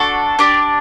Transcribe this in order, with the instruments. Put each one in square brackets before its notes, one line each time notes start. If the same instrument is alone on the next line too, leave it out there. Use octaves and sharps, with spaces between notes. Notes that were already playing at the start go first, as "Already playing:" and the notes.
Already playing: [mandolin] D4 F#4 A4
D4 G4